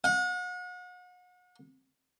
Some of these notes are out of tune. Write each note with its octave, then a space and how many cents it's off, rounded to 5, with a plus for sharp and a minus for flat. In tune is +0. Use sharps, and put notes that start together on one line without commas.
F#5 -40